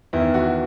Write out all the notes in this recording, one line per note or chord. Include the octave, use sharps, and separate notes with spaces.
E2 D#3 E4
F#4